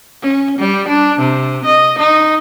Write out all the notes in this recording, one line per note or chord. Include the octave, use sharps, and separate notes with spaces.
C#4
G3
D4
C3
D#5
D#4